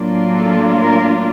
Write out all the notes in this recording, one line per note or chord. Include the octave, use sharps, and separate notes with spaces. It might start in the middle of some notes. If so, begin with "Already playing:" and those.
Already playing: A2 F#3 A#3 D4 F4
A4
A#4